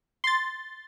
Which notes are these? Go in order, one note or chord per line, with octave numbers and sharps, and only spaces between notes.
C6 A6